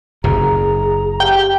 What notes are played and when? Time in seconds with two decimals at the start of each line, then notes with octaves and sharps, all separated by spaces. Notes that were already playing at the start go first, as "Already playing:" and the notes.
0.24 F#1 F#2 C#3 G#4 A#5
1.20 G4 G5